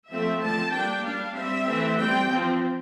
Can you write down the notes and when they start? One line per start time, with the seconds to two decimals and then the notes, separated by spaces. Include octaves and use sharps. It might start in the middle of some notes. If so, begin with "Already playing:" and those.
0.10 F3 A3 C4 E5
0.41 D3 F3 C4 A5
0.72 G3 A#3 D4 G5
1.03 G3 D4 F5
1.34 G3 C4 E5
1.66 E3 A3 C4
1.96 G3 C4 G5
2.28 F3 C4